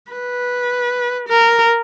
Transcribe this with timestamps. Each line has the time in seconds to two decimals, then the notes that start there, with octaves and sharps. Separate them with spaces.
0.12 B4
1.28 A#4